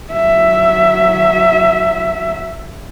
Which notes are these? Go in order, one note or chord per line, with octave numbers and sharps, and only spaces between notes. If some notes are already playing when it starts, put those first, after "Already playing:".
F#3 E5